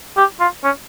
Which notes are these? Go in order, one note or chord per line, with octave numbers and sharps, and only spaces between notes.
G4
F4
C#4